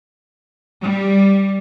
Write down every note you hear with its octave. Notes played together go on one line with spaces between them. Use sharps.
G3